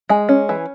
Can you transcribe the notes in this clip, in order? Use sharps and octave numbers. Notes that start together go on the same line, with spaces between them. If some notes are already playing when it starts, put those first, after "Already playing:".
G#3 G#5
C#4
E3